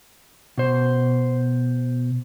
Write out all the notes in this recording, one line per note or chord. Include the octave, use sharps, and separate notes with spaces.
B2 C5